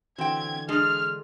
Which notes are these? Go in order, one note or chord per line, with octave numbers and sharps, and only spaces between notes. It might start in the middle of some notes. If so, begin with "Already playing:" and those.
D3 E3 C4 F#4 G5 G#6
G#3 D4 G#4 F6